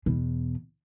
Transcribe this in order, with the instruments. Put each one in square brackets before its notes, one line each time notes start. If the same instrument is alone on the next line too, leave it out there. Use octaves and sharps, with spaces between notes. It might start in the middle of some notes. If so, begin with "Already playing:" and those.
[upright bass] E2 B2